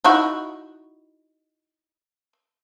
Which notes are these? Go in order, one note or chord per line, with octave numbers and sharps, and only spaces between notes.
D#4 E4 F#4